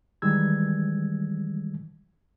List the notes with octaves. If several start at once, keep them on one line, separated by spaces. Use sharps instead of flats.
D#3 E3 G3 G#3 E6 G#6